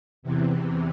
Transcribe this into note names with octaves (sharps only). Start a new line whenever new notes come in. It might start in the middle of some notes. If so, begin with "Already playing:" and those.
E2 C3 E3